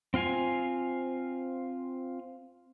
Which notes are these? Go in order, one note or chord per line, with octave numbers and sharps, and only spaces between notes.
C4 F4 F5 G#5